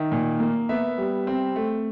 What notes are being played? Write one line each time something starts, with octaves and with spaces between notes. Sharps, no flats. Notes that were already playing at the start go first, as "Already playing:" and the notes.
Already playing: D#3 E5
A#2
A#3
B3 E5
G3
C4
A3